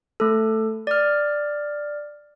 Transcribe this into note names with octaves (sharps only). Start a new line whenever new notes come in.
A3 A4
D5 F6